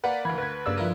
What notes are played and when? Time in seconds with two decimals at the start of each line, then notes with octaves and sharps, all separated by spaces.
0.04 A#3 B4 D5 F#5
0.25 D2 E3 B5 G#6
0.38 D2 B4 G#6
0.66 G2 C#3 G3 A#3 D5 E6
0.77 D2 F3 G3 E4 A#4